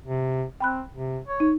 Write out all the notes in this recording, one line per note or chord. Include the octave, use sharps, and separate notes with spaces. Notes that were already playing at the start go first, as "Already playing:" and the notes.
C3
C4 G5 B5 F#6
C3
C#5
D#4